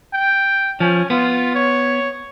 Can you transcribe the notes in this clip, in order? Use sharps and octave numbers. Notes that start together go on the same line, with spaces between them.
G5
F3 C#4
B3 F4
C#5